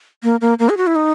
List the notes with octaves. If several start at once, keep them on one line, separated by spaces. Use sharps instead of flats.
A#3
A#3
A#3
G#4
F#4
E4
D#4